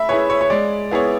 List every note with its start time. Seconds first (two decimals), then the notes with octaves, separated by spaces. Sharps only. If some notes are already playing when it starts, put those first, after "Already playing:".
Already playing: A3 E5 B5
0.09 E4 G#4 B4 C#5
0.30 C#5
0.41 C#5
0.50 G#3 D5
0.91 B3 E4 G#4 C#5